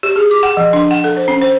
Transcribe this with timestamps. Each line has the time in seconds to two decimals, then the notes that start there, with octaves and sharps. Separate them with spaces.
0.03 G4
0.16 G#4
0.31 D6
0.43 F#5
0.57 F3
0.73 D4
0.91 F#5
1.04 A4
1.17 C5
1.28 C#4
1.42 C5